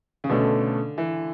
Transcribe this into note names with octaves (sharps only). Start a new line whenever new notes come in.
C#3
B2 D3 A3 C#4
E3